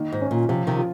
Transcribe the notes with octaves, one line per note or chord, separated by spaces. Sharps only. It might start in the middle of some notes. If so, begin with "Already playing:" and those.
Already playing: D#3 A#3
G#2
C#4
A#2
C3 F3
C3 D#3
F4